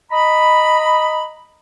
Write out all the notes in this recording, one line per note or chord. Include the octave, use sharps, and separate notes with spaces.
D#5 A#5 B5